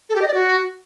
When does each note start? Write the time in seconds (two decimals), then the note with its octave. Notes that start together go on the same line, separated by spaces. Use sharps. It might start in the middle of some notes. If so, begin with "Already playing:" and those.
0.09 A4
0.15 G4
0.22 D#5
0.28 D5
0.34 F#4